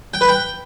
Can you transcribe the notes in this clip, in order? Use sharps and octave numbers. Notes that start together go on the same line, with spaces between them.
G5
B4
G5